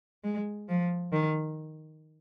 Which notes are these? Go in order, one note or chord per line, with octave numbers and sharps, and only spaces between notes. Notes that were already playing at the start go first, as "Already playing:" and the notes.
G#3
F3
D#3